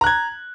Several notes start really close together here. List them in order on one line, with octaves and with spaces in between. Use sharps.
A#5 F#6 G#6